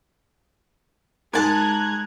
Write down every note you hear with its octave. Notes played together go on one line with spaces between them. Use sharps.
G#2 G#3 A#4 A5 A#5 F#6 G#6